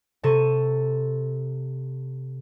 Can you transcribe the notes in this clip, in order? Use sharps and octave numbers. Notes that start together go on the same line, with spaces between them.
C3 A4 C#6 D#7